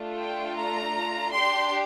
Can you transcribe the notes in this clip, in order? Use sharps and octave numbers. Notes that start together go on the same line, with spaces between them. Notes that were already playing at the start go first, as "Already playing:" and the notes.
Already playing: A3 D4 F4
G5
A#5
D4 G4 C6